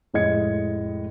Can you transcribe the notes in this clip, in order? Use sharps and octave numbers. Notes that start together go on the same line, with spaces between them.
F1 A2 G#3 D#5 G#6 C#7